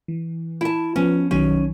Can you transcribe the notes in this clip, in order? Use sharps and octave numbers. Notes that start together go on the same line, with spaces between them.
E3
E4 A5
F3 B3 C#4
B1 D#3 F#3 C#4